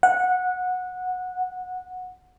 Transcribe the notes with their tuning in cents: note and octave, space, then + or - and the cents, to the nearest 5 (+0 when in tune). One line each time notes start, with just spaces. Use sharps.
F#5 -15